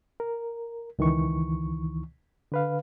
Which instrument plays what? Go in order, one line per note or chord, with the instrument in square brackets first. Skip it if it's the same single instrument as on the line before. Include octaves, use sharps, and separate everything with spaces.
[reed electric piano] A#4
C#2 D#3 E3 C#6
D3 B4 F5